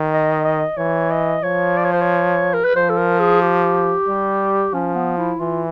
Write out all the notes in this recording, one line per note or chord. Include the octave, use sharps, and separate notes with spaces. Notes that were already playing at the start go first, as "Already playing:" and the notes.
Already playing: D#3
D#5
D#5
E3 C#5
D#5
F3 C#5
D5
C#5
C5
C#5
A#4
B4
F3 C5
A4
A#4
G#4
G4
G3
F3 C#4
B3
E4
E3 F4